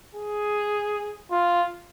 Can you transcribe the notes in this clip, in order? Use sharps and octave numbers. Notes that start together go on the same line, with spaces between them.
G#4
F4